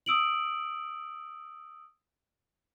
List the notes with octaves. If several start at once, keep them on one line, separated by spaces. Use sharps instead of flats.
D#6 E6 D7 F#7